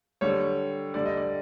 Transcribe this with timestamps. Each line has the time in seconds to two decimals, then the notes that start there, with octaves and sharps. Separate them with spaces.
0.21 D3 G3 C#5
0.94 D3 G3 D5
1.06 D#5
1.17 D5